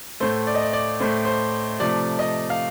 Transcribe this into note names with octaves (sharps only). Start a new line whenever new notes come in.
A2 A3 C5
D5
D#5
D5
D5
A2 A3 C5
C5
C3 F3 A3 D5
D#5
F5